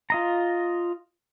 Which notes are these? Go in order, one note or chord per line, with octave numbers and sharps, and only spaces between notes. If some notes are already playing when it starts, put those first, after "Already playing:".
F4 D#5 A#5